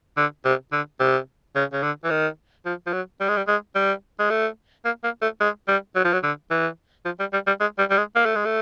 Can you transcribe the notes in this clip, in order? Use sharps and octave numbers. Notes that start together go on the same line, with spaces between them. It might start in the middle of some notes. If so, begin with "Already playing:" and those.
D3
C3
D3
C3
C#3
C#3
D3
E3
D#3
F3
F3
F#3
G3
G#3
G3
G#3
G3
G#3
A3
A#3
A#3
A3
G#3
G3
F#3
F3
F#3
D3
E3
F3
G3
G3
G3
G#3
G3
G3
G#3
A#3
A3
G#3
A3